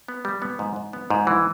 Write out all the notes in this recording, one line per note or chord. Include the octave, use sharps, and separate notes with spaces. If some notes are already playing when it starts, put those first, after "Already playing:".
B3
G3
B3
G#2
G#2
B3
G#2
E3